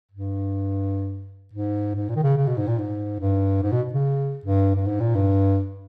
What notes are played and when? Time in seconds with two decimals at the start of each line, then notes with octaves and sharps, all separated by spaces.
0.12 G2
1.53 G#2
1.95 G#2
2.09 A#2
2.16 D#3
2.23 C#3
2.37 C#3
2.47 B2
2.57 G#2
2.67 A#2
2.78 G#2
3.20 G2
3.62 G#2
3.72 B2
3.93 C#3
4.46 G2
4.76 G2
4.86 G#2
5.00 A#2
5.15 G2